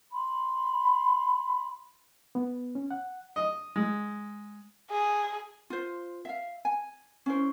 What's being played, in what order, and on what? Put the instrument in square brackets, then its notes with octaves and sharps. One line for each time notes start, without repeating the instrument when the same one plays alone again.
[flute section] B5 C6
[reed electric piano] B3
C#4
F#5
[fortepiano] D#5
G#3
[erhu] G#4
[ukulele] F4 C5
E5 F5
G#5
C#4 E4 C5